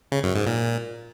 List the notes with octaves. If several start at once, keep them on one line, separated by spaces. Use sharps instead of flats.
C#3
F#2
G#2
A#2